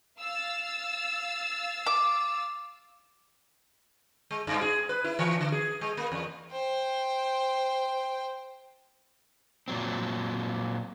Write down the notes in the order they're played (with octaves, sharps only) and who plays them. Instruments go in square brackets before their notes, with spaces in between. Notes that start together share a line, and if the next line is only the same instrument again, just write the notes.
[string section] F5 E6 A6
[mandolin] D6
[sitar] G#3
G2
G#4
B4
E4
E3
D3
G#4
G#3
A#3
E2
[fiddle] C5 G5
[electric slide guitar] A#2 F#3 C4